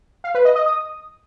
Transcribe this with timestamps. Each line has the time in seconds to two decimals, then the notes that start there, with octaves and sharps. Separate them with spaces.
0.24 F5
0.35 B4
0.45 D#5
0.56 D#5
0.66 D#6